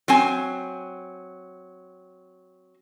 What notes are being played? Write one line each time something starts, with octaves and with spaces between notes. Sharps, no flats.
F#3 C4 G#5